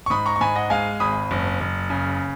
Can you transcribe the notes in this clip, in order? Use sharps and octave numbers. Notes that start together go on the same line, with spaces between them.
C#6
G#2 B5 D#6
A#5 C#6
C#6
G#2 G#5 B5
D#5 F#5
G#3 F5 G#5
G#1 B5 D#6
F#1
F#1
C#3